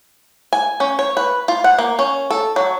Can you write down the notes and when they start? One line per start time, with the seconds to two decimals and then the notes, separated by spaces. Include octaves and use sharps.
0.53 G#5
0.80 C#4
0.99 C#5
1.17 B4
1.48 F4
1.64 F#5
1.79 A#3
1.99 C#4
2.31 A4
2.56 F#3